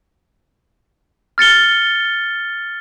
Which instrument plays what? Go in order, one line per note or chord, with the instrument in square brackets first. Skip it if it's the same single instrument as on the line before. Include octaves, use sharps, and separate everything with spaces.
[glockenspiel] F6 A6 C#7 G7